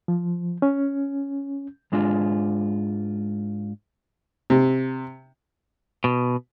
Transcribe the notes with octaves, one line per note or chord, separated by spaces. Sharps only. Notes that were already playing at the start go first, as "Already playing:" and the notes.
F3
C#4
G#2 G#3 D4 F4
C3
B2